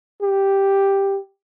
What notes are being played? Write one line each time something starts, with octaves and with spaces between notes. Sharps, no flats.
G4